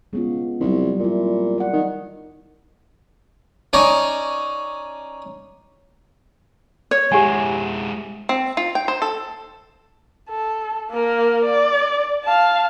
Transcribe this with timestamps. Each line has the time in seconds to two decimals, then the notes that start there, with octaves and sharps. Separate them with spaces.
0.13 C#3 G#3 B3 F4
0.60 C2 F#3 G3
0.99 A#2 C4 E4
1.58 D5 F#5
1.73 D#3
3.73 C#4 D#4 D5 A5 A#5
6.91 C#5
7.12 G#3 E4 G4 F#5 G#5
8.29 C4
8.57 F4
8.75 G5
8.88 C5
9.02 A4
10.29 A4
10.91 A#3 A#4
11.44 D5
12.24 F5 A5